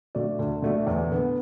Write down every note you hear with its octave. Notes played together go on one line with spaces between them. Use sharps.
D3 A3 F#4 D5
D2
D3 A3 F#4 D5
E2
D3 B3